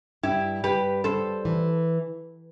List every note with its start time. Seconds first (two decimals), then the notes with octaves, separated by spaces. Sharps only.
0.23 G2 E4 G4
0.64 G2 G4 B4
1.04 G3 A4 C5
1.45 E3